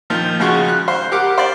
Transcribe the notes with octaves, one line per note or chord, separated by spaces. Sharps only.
A#2 D#3 F3
C#3 F3 G#3 F#4 C6 C#6
F#6
C5
G4 A#4 F#5 D6
C5 D5